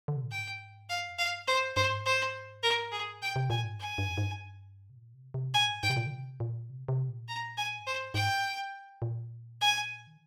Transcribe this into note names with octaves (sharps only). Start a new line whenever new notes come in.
D3
C3
A#2
G#2 G5
G2 F5
F2
F5
G2
F2 C5
G2
G2 C5
G#2
C5
A#4
G#4
A#2 G5
C3
A#2 G#5
G#2
G2 G#5
G2
F2
G#2
G2
C3
A#2
C3
C3
A#2 G#5
G#2
G#2 G5
C3
A#2
D3
C3
A#2
C3
C3
A#2
A#5
G#5
G#2
G2 C5
G#2
G#2 G5
A#2
G#5
D#3